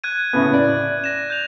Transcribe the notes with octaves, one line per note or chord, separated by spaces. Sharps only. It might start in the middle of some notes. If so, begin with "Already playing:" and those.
F#6 G#6 D#7
A2 C#3 B3
D5
A#6 E7
G6 F7